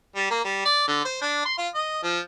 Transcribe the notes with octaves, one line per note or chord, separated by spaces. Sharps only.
G3
A#3
G3
D5
D3
C5
D4
C6
F4
D#5
F3